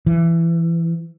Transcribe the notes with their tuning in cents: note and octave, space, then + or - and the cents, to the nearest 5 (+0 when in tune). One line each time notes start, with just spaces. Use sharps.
E3 +20